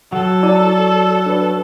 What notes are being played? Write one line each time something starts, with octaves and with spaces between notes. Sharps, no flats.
F#3 A4 F#5
E4 D5 A5
D4 B4